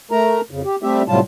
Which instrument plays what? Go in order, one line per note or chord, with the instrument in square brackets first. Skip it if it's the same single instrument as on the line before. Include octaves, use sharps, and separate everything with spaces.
[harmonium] A3 A#4 A#5
F2 C#3
G4
G3 A3 C4 G4 E5
A2 C3 F#3 G3 F4 A5